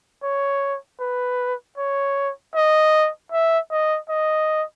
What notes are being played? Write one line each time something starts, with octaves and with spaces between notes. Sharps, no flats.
C#5
B4
C#5
D#5
E5
D#5
D#5